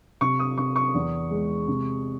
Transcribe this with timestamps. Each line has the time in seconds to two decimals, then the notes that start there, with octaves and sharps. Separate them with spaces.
0.21 C3 C#6
0.39 D#6
0.58 C3 C#6
0.76 C#6
0.94 E2
1.31 G#3
1.68 C3